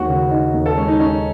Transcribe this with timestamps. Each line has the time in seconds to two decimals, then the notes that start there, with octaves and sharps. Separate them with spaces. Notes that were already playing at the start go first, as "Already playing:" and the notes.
Already playing: D#2 G#3 F#4
0.09 C#3
0.31 D#4
0.54 D#2
0.66 A4
0.77 G#3 C#4
0.88 D#4
1.00 C#4 D#4